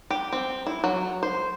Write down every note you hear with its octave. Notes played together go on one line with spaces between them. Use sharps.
G4
C4
E4
F#3
C5